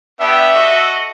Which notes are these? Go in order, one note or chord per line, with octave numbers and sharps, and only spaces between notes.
B3 D4 G4 E5
F#4 A4 D#5